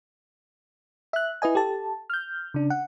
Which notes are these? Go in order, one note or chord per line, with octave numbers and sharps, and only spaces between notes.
E5 F#6
E4 B4 D#5 G#5
G4 A4 A5
F6 G6
C#3 D4
F#5